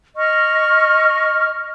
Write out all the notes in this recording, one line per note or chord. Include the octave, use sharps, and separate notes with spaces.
D#5 C#6 F6